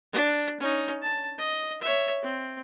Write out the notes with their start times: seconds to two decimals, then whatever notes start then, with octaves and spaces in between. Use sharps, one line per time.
0.13 D4
0.60 C#4 D#4
1.02 A5
1.38 D#5
1.81 C#5 E5
2.22 C4